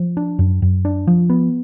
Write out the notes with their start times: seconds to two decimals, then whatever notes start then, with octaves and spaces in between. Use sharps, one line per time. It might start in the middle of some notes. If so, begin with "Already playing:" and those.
Already playing: F3
0.17 D4
0.39 F#2
0.62 F#2
0.85 D4
1.07 F3
1.30 B3